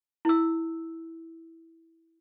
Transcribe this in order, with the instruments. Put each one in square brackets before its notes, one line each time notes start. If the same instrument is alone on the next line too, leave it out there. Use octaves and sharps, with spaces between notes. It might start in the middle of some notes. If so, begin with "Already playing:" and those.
[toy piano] E4 E6